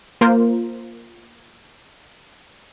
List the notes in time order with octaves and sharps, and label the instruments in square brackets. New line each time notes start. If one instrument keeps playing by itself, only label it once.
[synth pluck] A#3 F4 A#4 C5